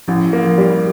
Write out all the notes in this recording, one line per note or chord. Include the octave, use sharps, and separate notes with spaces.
A1 F3
A#3
F3
G3